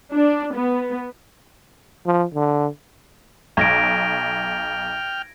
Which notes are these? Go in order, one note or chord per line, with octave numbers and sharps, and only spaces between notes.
D4
B3
F3
D3
B1 G5 F6 G#6 A#6 D7